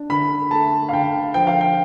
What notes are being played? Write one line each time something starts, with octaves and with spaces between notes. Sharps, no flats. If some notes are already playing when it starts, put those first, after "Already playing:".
Already playing: D4
D3 B5
A3 A5
F5
D3 G5
F3 G5
F5
G5